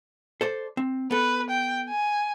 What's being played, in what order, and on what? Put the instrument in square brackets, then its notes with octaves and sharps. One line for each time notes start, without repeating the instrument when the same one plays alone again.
[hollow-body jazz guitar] A4 C5 D5
C4
[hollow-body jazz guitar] B3 A4 [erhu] B4
[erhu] G5
G#5